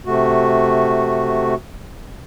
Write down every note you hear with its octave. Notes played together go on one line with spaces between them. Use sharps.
C3 A3 F#4